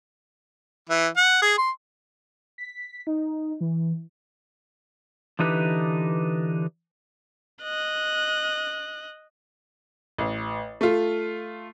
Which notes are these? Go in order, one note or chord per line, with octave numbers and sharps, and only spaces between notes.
E3
F#5
G#4
C6
B6
D#4
E3
D3 E3 D4 D#4 G4 B4
D#5 F#6
A1
A3 F4